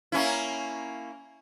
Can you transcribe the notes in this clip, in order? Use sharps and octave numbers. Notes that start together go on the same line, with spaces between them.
A#3 C#4 E4